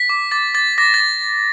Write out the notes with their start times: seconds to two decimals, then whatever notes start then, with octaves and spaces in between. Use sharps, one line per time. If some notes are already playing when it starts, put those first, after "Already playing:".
Already playing: B6
0.09 D6
0.31 D6 A6
0.54 D6 A6
0.78 D6 A#6
0.94 A6
1.00 D6